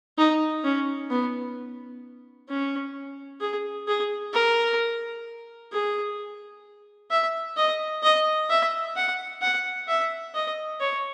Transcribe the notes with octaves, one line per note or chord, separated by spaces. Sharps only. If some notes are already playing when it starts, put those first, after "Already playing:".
D#4
C#4
B3
C#4
G#4
G#4
A#4
G#4
E5
D#5
D#5
E5
F#5
F#5
E5
D#5
C#5